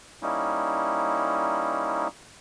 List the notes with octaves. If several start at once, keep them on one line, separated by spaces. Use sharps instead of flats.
G3 A#3 C#4 D#4 E4